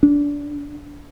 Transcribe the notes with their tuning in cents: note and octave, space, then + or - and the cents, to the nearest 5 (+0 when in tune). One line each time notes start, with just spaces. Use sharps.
D4 -20